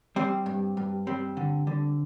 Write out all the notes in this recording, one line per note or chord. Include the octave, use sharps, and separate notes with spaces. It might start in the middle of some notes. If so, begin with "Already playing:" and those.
G3 C4
G2
G2
G3 C4
D3
D3